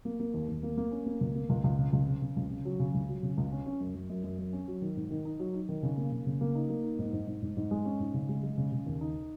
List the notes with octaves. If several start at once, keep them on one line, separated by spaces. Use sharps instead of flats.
A#3
A#3
D#2
D#2
A#3
A#3
C#4
A#3
C#2
A#3
C#2
C#2
C#3
C#2
C#3
C#3
C#2
C#3
F#3
C#3
C#2
F#3
C#3
C#2
C#4
C#4
F#2
F#2
F#2
F#2
F#2
C#4
F#3
D#3
G#2
D#3
D#4
F#3
D#4
D#3
C#3
A#3
C#3
C#3
A#3
D#4
A#3
D#4
G#2
G#2
G#2
G#2
G#2
G#3
C#4
G#2
C#3
G#3
G#3
C#3
C#3
D#2
D#4